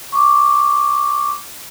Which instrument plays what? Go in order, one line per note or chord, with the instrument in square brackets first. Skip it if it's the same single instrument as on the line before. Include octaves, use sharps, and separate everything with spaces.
[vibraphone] C#6 D6